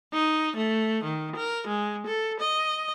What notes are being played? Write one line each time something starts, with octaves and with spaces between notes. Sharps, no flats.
D#4
A3
D#3
A#4
G#3
A4
D#5